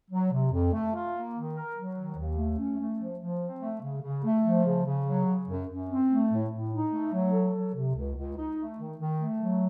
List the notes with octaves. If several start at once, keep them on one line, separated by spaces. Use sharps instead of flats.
F#3
C3
F2
A3
F4
A#3
D#3
A#4
F#3
D#3
D#2
A3
C#4
A3
F3
F3
C4
A3
C#3
C#3
A3
F3
C#3
C#3
F#3
C#3
F#2
F#2
C4
A3
A2
A2
D#4
A3
F#3
A4
F#3
C3
C#2
C#2
D#4
A3
D#3
D#3
A3
F#3